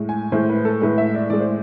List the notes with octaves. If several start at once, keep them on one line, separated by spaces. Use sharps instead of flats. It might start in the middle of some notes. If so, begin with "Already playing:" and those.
Already playing: A2 G#3
G#5
A2 G#3 C5
B4
A4
A2 G#3 B4
E5
D5
A2 G#3 D5
C5